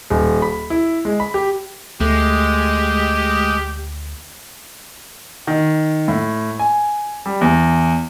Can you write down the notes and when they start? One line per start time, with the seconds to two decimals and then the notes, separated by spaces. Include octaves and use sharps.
0.10 D#1
0.42 B5
0.70 E4
1.05 G#3
1.20 B5
1.34 G4
2.01 D2 G#3 A3 G4
5.47 D#3
6.08 A2
6.59 G#5
7.26 G3
7.41 E2